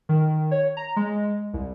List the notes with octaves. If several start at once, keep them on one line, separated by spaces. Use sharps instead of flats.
D#3
C#5
A#5
G#3
C2